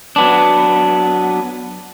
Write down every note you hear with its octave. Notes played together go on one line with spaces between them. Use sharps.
F#3 B3 D4